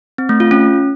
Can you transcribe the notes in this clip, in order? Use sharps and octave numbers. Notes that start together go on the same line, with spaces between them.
C4
A3
F4
C#4